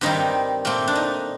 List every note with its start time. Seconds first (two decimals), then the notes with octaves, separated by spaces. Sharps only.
0.01 G2 D#3 G3 C4 D#4
0.65 A#2 A3 C4
0.88 D4
0.95 D#4